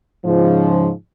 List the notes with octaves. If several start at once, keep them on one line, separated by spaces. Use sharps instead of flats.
G#2 C#3 F3